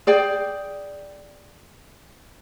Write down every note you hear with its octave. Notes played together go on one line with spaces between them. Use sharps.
G#4 D5 G5